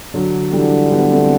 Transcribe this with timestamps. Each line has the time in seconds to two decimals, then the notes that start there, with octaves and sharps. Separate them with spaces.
0.14 D3 F#3
0.52 D3 E3 G3
0.91 G3 B3
1.11 A3 C4